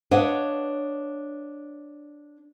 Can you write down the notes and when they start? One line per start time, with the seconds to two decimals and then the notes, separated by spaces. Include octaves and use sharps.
0.11 D4 B4 C#5 D#5 F5 F#5